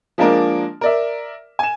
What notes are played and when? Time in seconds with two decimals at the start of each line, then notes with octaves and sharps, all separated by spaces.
0.18 F3 G#3 A#3 D4 A#4
0.81 A#4 D5 E5
1.59 G#5 E7